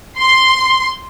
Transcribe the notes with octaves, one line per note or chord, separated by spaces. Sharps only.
C6